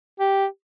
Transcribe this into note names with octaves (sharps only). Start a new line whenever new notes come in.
G4